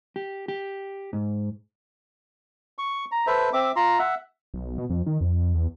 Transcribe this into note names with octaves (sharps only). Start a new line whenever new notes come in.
G4
G4
G#2
C#6
A#5
A4 B4 C5 E5
C4 E5 D6
F4 A#5 C6
E5 F#5
B1
B2
F2
D#3
F2
E2